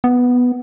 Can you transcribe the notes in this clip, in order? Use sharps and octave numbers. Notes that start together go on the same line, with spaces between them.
B3